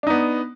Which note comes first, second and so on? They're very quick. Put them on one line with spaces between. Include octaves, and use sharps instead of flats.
D4 D#4 B3